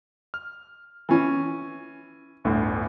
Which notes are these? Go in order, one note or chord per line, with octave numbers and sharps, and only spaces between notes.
F6
E3 C#4
G1 D2 A2